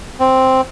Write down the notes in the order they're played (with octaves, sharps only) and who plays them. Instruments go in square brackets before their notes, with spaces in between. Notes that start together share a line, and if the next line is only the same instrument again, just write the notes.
[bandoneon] C4